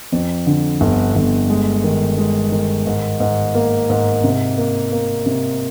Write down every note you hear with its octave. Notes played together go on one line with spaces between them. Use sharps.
F2
D3
G1
G1
G#3
D#3
G#3
D#3
G#2
G#2
A#3
G#2
C3
A#3
A#3
C3